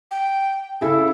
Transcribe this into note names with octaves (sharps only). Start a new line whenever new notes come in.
G5
C#3 E4 G#4 A4